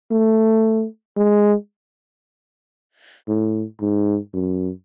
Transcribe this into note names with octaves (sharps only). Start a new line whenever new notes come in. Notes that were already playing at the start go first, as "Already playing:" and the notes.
A3
G#3
A2
G#2
F#2